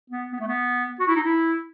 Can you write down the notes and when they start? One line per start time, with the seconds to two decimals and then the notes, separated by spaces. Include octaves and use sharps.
0.10 B3
0.32 B3
0.40 A3
0.48 B3
1.00 F#4
1.08 E4
1.15 D#4
1.23 E4